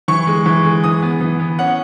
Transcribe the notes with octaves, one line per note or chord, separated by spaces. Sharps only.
E3 C#6
G#3
E3
G#3
E3 D#6
B3
E3
B3
C#4 F#5